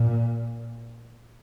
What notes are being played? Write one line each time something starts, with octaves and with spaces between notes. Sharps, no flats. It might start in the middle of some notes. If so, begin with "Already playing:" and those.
Already playing: A#2